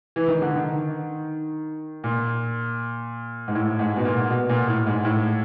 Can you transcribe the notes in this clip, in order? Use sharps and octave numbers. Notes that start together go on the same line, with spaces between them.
E3
D#3
D3
D#3
A#2
G#2
A2
G#2
B2
A#2
B2
A#2
A2
G#2
A2